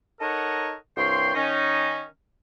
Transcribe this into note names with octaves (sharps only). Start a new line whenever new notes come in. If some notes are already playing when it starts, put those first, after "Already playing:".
D#4 A4 A#4 C#5 D#5 F#5
C2 G2 C#5 G5 C6
D#3 C#4 D#4